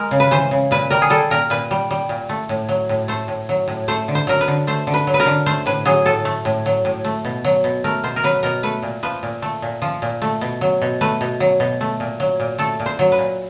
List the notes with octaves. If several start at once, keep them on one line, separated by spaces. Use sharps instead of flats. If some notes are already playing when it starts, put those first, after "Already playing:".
Already playing: G#3 A#4
C#3
B4
E3 C5
C#3
A#2 B4
G3 A#4
G#4
G3 A4
A#2 A#4
A#2 B4
G3
G3
A#2
A3
A2
F#3
A2
A3 C5
A2
F#3
A2
A3 C5
D3
C5
F#3 A#4
B4
D3
A3 C5
D3
B4
F#3
B4
A#4
D3
A3 C5
A2 B4
F#3 G#4
A2 A4
A3
A2
F#3
A2
A3
B2
F#3
B2
A3 A#4
B2 C5
A#4
F#3 B4
B2 A#4
A3 B4
A#2
F3 B4
A#2
A3
A#2
F3
A#2
A3
B2
F#3
B2
A3 B4
B2
F#3
B2
A3
A#2
F#3
A#2
A3 A4
A#2
C5
F#3
B4
A#2